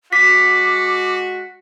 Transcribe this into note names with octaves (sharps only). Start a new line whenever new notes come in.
G#3 F#4 D6 B6